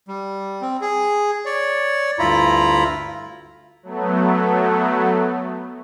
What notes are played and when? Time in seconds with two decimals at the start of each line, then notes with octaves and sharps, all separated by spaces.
0.08 G3
0.62 C4
0.81 G#4
1.45 C#5 D5
2.19 D2 G2 E4 F4 A#5 B5
3.83 F#3 A3 B3